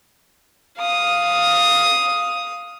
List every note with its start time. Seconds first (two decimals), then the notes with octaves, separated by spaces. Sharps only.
0.78 F5 D#6